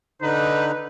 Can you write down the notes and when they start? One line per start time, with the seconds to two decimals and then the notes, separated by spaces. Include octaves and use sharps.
0.22 D3 D#4 B4